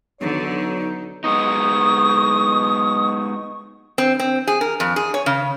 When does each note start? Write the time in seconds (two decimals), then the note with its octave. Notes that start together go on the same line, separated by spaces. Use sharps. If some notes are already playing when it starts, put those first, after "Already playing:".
0.21 B1 D3 F#3 D#4 C#5
1.24 G#3 B3 D#4 C#6 D#6
3.98 C4
4.19 C4
4.47 G#4
4.61 A#4
4.80 F2
4.96 G#4
5.14 C#5
5.26 C#3